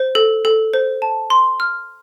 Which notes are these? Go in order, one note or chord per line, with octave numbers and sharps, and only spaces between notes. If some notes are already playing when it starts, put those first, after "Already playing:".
Already playing: C5
A4
A4
C5
A5
C6
F6